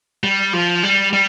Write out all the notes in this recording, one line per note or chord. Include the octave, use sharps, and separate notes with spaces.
G3
F3
G3
G3